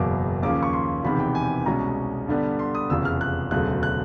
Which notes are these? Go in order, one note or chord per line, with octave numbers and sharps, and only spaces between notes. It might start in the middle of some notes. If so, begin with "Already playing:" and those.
Already playing: F#1 E2 B2 F#3 A#3 D6
D#2 C#3 F3 A#3 C#4 D6
C#6
C6
E1 E2 C3 D#3 B5
G5
G#5
C2 B2 G#3 C#4 A#5
G2 D3 G3 B3
C6
D#6
F1 E2 C#3 E6
F6
F#6
E1 D2 C#3 F#3 A3 F#6
F#6